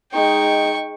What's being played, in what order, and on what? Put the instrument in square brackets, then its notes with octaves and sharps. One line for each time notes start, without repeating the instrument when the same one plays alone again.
[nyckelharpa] G#3 D#4 [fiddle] G5 C#6